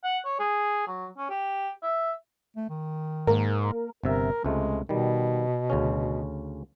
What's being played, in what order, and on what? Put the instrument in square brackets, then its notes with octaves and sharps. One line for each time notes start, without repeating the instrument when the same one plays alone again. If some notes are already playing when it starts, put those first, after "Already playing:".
[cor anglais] F#5
C#5
G#4
F#3
C#4
G4
E5
[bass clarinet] A3
D#3
[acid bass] G#2 [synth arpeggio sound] A#3 A#4
[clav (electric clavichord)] G1 C3 E5 [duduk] A#4
[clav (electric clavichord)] C#2 C3 A3 [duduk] G#3
[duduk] B2 [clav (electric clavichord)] D#3 G3
[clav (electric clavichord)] D2 C#3 C#4